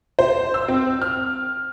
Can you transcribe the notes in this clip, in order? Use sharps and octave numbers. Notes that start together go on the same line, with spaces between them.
C5
E6
C4
F6